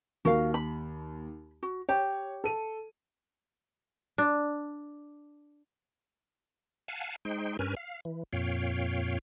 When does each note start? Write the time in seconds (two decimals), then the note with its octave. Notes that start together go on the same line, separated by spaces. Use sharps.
0.25 D#2 F#4 A#4 F5
0.54 B5
1.63 F#4
1.89 G4 C#5
2.44 A4 D#7
4.18 D4
6.88 F5 F#5 G#5 A5
7.25 G#3 D#4 C5 G5
7.59 G2 C#4 A#4 B4 G#5 F6
7.77 F5
8.05 E3
8.33 F2 A#2 C#5 F5 G5